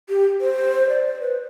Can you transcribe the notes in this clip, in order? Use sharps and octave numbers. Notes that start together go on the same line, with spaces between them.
G4
C5
D5
C5
B4